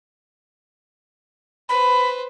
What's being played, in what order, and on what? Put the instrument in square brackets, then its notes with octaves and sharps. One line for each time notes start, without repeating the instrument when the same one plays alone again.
[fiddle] B4 C5 [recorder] B5